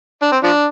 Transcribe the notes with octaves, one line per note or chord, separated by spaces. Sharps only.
D4
C4
F3 D4